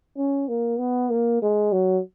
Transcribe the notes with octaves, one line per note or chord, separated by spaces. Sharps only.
C#4
A#3
B3
A#3
G#3
F#3